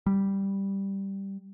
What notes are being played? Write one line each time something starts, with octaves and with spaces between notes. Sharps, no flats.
G3